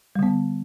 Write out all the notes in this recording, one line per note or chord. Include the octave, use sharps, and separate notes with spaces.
D3 G3 B3